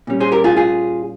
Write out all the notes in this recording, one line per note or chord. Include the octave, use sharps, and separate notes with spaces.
A#2 G3 C#4
G#4 C5
G4 A#4
F4 G#4
F4 G#4